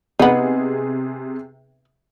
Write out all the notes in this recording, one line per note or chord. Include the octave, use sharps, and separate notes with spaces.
C3 B3 D#4 G#4